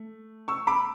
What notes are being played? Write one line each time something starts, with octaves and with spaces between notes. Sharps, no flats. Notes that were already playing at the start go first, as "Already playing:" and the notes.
Already playing: A3
C#6 E6
B5 D6